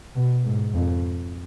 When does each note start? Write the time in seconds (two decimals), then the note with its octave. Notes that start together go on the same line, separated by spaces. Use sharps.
0.16 B2
0.45 G#2
0.74 F2